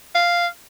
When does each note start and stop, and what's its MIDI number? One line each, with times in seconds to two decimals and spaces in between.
0.15 0.47 77